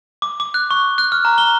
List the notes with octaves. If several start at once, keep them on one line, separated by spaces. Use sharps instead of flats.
D6
D6
F#6
C#6
F#6
F6
A#5
G7